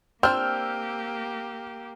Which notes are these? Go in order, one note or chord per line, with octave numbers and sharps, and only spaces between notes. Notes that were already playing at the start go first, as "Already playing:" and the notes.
A#3 C4 D4 G4 E6 F6 G6